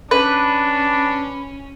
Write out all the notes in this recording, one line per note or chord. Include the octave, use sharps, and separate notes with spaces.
C#4 D4 B4